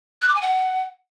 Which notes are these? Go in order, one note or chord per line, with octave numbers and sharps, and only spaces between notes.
F#6
D6
G#5
F#5